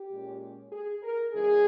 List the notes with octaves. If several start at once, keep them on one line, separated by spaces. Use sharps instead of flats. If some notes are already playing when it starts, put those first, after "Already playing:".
Already playing: G4
A#2 G#3 C#4
G#4
A#4
C#3 E3 G#3 G#4